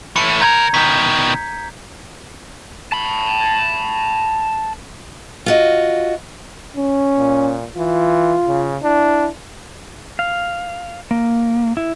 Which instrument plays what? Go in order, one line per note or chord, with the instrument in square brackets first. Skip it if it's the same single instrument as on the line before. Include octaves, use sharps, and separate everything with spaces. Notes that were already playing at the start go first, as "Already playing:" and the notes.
[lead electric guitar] E3 A3 [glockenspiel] C#7
[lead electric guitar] C#2 A#4 [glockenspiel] A#5 G6 G#6
[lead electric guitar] B2 D#3 [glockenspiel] G6 B6
[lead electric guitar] A5 B5
[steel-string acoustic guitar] F4 F#4 D#5
[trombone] C#4
[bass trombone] A#2
[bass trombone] E3 [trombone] F4
[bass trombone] C#3
[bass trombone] D4 [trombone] E4
[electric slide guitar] F5
A#3
E4